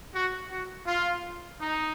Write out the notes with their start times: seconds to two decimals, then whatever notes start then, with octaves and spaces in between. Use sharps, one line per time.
0.14 F#4
0.50 F#4
0.86 F4
1.60 D#4